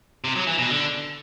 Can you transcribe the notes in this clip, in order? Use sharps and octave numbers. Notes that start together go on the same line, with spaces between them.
C3
F#3
E3
B2
D3